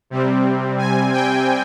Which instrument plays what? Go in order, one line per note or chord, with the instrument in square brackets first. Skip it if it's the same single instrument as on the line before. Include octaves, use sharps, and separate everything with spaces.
[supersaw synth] C3 G3 C4
G#5
G5